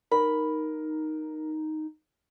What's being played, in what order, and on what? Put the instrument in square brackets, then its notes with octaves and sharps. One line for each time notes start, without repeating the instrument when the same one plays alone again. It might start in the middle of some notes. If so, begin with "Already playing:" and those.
[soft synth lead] D#4 [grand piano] A#4 [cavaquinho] B5